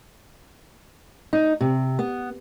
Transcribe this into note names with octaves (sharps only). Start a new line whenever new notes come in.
D#4
C3
B3